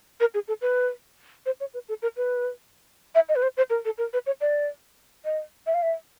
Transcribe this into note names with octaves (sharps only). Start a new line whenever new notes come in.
A#4
G#4
A4
B4
C5
C#5
B4
A4
A#4
B4
E5
D#5
B4
C5
C5
A#4
A4
A#4
B4
C#5
D5
D#5
E5
F5
E5